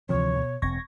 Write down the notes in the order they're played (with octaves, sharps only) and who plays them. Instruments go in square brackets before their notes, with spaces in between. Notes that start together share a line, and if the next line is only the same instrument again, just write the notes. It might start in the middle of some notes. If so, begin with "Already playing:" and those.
[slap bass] D2 E3 [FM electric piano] C3 F3 [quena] C#5
[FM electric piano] B2
[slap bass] E1 C4 [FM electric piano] C#6 G#6 A#6